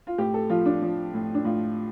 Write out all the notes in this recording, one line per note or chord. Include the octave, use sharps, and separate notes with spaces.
F4
A2 G4
A4
F3 F4
D4
F3
A2
D4
A2 F4